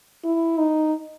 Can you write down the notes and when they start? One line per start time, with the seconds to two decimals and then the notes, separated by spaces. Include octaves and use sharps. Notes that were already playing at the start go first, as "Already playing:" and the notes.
0.24 E4
0.58 D#4